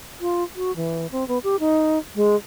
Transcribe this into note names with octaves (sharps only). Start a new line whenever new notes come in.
F4
F#4
E3
C4
B3
G4
D#4
G#3